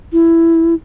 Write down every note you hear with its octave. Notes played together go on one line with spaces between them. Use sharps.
E4